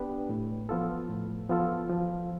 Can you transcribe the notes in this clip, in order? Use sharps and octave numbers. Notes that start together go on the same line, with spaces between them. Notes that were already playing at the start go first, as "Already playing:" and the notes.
Already playing: B3 D4 G4 B4
A2
F3 B3 F4 A4
A2
F3 B3 F4 A4
F3